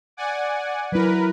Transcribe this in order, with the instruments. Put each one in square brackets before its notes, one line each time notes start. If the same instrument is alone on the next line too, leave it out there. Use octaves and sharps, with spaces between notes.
[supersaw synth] D5 F#5 G#5
[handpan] F#3 E4 [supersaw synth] A#4 B4